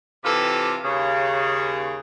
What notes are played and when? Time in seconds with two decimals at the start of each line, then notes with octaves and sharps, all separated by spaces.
0.24 C3 E3 F4 G4 A4
0.84 D#2 C#3